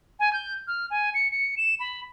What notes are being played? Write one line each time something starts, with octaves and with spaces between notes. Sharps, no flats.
G#5
G6
F6
G#5
C#7
C#7
E7
B5